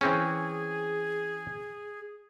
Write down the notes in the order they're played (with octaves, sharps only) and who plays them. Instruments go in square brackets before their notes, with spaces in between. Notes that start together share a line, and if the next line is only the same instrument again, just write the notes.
[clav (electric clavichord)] E3 C4 C#4 [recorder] G#4